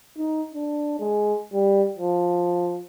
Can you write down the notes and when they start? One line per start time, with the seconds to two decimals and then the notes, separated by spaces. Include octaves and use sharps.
0.18 D#4
0.54 D4
1.00 G#3
1.53 G3
1.99 F3